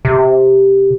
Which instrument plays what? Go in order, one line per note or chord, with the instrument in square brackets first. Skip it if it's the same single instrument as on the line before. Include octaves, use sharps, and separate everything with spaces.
[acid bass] C3